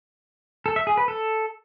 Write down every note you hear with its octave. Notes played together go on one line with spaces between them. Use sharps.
A4
E5
G#4
B4
A4